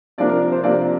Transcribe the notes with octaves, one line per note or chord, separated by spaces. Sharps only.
C3 F3 A#3 D4 D5
A#4
C5
C3 F3 A#3 D4 D5